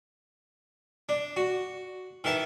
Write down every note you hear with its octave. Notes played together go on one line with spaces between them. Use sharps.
D4
F#4
D#3 E3 E5 A5